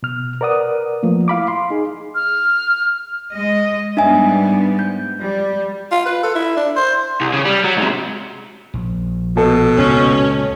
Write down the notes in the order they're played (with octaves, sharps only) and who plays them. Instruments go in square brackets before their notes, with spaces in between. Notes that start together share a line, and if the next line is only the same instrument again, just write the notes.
[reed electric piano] B2 F6
A#4 B4 D5 F#5 D#6
F3 A3 A#3
E4 F5 B5 D6
C6
D#4 G#4
[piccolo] F6
[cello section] G#3 D#5
[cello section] G#2 G3 B3 [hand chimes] D4 E5 G#5
[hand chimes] G6
[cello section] G3
[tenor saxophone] F4
B4
A4
E4
D4
C5
[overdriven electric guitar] C2
C#3
G3
F#3
G#2 C3
[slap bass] A#1
[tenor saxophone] B2 [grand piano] A4
[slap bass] C#2 A#2 C#3 [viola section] C#4